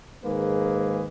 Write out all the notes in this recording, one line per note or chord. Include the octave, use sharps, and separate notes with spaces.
G#2 D#3 G#3 A#3 G#4 B4